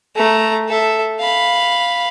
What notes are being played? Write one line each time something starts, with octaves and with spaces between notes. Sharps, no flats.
A3 A#5
A4 E5
F5 B5